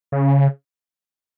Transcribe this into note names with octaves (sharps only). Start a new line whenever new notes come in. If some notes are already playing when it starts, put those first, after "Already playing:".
C#3